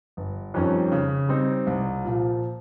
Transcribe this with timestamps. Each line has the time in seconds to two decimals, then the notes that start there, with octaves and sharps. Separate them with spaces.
0.17 G1
0.54 F2 D#3 G3 C#4
0.92 C#3
1.29 G3 C4 D#4
1.67 C2
2.04 A#2 F3